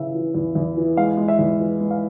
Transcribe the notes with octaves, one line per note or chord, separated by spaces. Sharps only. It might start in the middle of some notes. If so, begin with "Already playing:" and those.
Already playing: C#3 E3 E5
E3
E2
E2
E3
G#3 F5
G#3
E5
E2
E3
G#3
F5